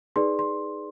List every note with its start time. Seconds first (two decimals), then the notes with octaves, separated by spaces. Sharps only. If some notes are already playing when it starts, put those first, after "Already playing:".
0.16 D#4 G#4 B4 D5 C6
0.39 C6